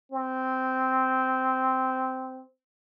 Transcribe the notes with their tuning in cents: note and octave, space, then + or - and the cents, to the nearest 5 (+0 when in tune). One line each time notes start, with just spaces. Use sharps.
C4 -10